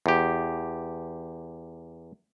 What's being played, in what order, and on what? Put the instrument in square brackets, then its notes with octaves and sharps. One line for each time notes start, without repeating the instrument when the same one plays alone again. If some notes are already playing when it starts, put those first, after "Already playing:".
[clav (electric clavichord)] E2 G4